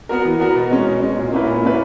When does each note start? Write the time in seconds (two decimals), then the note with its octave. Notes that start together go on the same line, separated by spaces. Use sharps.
0.09 B3 F#4 A#4
0.25 E3
0.40 B3 F#4 A#4
0.55 B2
0.71 G#3 C#4
0.86 B2
1.01 G#3 C#4
1.17 A#2
1.32 A#3 C#4 E4 B4
1.47 A#2
1.63 A#3 C#4 E4 B4